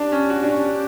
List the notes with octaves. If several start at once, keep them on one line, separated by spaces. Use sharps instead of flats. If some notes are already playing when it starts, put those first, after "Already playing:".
Already playing: D4 G4
C#4
F#4
D4
C#4